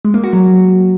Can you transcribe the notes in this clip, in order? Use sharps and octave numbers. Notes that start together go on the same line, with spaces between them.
G#3
A#3
F#4
F#3